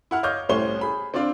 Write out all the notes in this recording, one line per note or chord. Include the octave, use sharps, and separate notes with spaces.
E4 F#5 F6
C#5 D#5 F5 D6 F6 G6
C2 A2 C#4 C5 C#6 G7
G#4 B5
C4 D4 F4 D5 F5